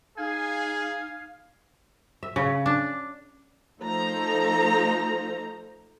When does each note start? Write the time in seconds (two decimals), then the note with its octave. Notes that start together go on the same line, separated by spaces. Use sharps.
0.18 D#4 G#4 F5 G#5
2.23 E5
2.36 C#3
2.66 D4
3.81 F3 A3 D#4 A4 C5 A#5